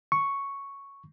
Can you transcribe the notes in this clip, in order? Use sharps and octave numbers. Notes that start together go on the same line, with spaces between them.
C#6